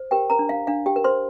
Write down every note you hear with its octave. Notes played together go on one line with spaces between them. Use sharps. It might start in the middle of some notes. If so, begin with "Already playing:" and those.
Already playing: C5
G4 A#4 G5
A#4 A#5
D4
F5
D4 F5
G4 G5
A#4
C5 C6